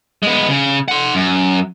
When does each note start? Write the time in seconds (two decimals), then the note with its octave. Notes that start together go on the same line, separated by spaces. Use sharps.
0.23 G#3 B3
0.49 C#3
0.88 F#5 C6
1.14 F#2